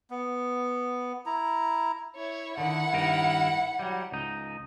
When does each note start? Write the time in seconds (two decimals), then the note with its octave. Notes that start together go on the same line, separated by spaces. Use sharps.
0.11 B3
1.26 E4 A#5
2.16 E4 C#5
2.58 D3 D#3 E4 F#5
2.93 G2 D#3 A#4
3.79 F#3 G3
4.12 C#2 D#4